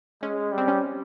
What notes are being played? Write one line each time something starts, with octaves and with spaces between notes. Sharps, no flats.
G#3 C#4
G3
C4
C#4